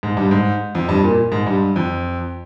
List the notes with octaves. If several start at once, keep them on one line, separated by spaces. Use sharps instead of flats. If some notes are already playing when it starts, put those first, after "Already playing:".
G#2
G2
G#2
F2
G2
A#2
G#2
G2
F2